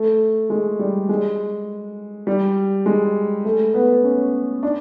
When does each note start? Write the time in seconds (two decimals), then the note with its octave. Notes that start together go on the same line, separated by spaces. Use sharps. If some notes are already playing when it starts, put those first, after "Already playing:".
Already playing: A3
0.50 G#3
0.79 G3
1.09 G#3
2.27 G3
2.86 G#3
3.45 A3
3.74 B3
4.03 C#4
4.63 D4